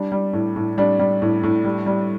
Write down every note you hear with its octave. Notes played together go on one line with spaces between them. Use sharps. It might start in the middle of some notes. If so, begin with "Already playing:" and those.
Already playing: G3 D4
G3
A2
A2
G3 D4
G3
A2
A2
G3
G3